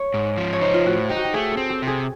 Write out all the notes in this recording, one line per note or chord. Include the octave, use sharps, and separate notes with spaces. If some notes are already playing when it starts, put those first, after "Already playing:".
Already playing: C#5
G#2
F3
C#5
D#4 C5
F4
A2 F#4
D#4 G4
F#4
G4
A3 G#4
A4
C4
G4
C3 G#4